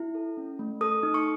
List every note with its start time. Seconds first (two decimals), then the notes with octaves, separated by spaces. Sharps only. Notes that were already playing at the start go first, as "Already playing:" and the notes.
Already playing: E4
0.15 A4
0.37 C#4
0.59 A3
0.81 A4 D#6
1.03 D#4
1.14 C#6